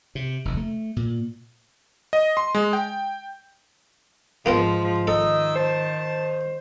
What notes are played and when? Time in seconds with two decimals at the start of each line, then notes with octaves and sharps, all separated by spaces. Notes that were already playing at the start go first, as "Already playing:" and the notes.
0.15 C3
0.45 F1 D#2
0.57 A3
0.96 A#2
2.13 D#5
2.37 C6
2.55 G#3
2.73 G5
4.46 G#2 F3 A#3 B3 A#4
5.07 D#3 D#4 A4 D#5 E6
5.56 C5 A5